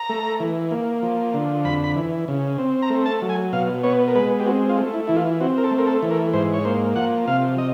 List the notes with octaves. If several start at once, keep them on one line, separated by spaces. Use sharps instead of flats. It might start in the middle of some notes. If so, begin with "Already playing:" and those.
Already playing: A#5
A3
E3
A#3
F3
D3
F2 B5
B5
E3
C#3
C4
A#5
A3
A5
F#3
G#5
B2 F5
B3 C#5
A#4
G#3 B4
G4
C4 F#4
F4
A3
E4
E3 E4
F4
C4 F#4
A#4
A4
A3
A#4
A4
E3
A#4
G#2 C5
C#5
A#3 C5
F3 F#5
C3 F5
D#5